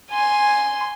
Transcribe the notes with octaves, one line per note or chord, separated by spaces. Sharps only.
G#5 C6